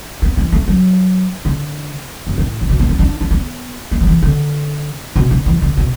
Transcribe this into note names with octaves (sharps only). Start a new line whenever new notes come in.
B3
E3
A3
F#3
D3
F#2
A2
D3
B2
B3
D4
D4
D4
B3
A3
F#3
E3
D3
B2
D3
E3
D3
B2